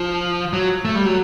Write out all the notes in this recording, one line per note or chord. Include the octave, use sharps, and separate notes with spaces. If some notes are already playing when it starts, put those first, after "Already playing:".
Already playing: F3
F#3
A3
G3
F#3